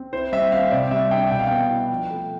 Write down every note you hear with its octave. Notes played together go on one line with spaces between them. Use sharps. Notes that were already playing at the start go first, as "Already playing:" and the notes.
Already playing: C4
E4 C5
G3 E5
C4 F5
C3 D5
G3 E5
D4 G5
B2 G5
F5
B3 G5
E4
F3
A3